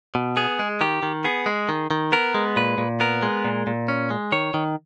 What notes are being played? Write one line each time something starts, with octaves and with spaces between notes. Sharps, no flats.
B2
B3 G#4
G#3
D#3 G4
D#3
B3 G#4
G#3
D#3
D#3
B3 A#4
G#3
A#2 B4
A#2
B3 A#4
G#3
A#2
A#2
C#4
G#3
D#3 C#5
D#3